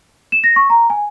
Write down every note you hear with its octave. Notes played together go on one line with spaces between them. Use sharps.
E7
A#6
C#6
A#5
G#5